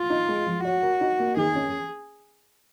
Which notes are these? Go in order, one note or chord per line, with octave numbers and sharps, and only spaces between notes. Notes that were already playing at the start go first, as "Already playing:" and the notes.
Already playing: F4
D#4
G#3
F3
F#4 C#5
A#4
D#4
A#3
D#3 G#4
C#4